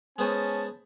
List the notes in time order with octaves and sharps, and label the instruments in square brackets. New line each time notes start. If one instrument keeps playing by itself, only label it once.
[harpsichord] G#3 B3 C5 [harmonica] C#4 A5